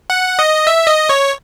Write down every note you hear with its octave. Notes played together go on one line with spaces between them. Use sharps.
F#5
D#5
E5
D#5
C#5